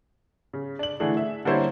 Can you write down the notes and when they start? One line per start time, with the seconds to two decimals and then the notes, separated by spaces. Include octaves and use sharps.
0.53 C#3
0.79 D4 F#7
1.00 D3 E3 A3 D4 G#4
1.17 E5
1.45 D3 G3 A#3 E4 C5 C#5